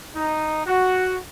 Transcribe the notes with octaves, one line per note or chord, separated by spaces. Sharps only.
D#4
F#4